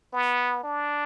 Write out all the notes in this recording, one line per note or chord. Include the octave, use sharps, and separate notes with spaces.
B3
D4